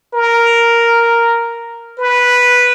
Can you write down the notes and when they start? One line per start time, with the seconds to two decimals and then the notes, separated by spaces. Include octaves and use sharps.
0.14 A#4
1.99 B4